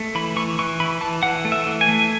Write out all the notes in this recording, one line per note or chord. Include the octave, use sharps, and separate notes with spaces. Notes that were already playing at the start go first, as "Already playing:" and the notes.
Already playing: A3
E3 B5
E3 C#6
E3 C#6
E3 B5
E3 A5
E3 F#5
A3
E5
E3
G#5
A3